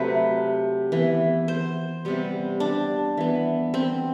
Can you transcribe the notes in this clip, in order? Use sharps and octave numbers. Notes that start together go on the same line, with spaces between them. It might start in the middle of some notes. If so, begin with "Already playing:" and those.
Already playing: C3 F#3 A3 B4
E3 B3
C5
C3 G3 B3
D4
E3 B3
C4